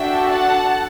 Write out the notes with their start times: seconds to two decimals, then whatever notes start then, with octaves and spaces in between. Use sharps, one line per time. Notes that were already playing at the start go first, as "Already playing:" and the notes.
Already playing: D4 F#4 A4 E5 G5
0.32 F#5 A5